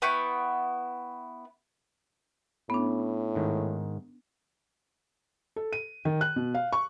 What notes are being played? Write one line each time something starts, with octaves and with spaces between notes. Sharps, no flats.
B3 E4 G5 C#6
A2 B3 C#4 D4
G#2 D#3
A4
D#7
D#3
F#6
B2
F5
C#6